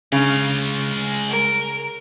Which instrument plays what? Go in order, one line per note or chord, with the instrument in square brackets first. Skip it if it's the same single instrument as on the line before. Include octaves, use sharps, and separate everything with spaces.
[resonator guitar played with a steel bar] C#3 [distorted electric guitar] G#3 F5
[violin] A#4